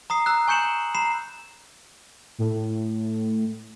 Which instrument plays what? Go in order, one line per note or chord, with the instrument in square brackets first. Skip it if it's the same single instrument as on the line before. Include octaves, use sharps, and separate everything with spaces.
[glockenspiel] A#5 D#6 C7
A#5 E6 F#6
G#5 C#6 G6 C#7 E7 F#7
A#5 B5 C7 E7
[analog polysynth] A2